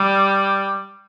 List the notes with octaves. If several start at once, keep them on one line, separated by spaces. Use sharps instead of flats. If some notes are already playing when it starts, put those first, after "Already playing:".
Already playing: G3